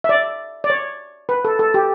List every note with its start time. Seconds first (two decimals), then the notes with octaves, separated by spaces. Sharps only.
0.04 E5
0.09 D5
0.64 D5
0.70 C#5
1.29 B4
1.45 A4
1.59 A4
1.74 G4